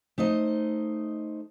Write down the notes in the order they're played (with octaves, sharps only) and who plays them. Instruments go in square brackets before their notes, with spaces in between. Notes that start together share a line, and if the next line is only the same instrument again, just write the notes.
[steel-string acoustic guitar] A3 D#4 C5 D#5